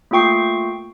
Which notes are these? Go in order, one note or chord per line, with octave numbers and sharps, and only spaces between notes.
A3 A#3 F4 G5 C#6 C7